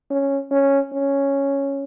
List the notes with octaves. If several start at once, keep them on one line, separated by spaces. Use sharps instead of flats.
C#4
C#4
C#4